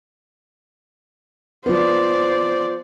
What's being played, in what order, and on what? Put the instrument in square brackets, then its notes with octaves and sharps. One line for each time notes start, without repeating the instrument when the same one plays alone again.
[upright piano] F3 B3 [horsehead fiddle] C5 D5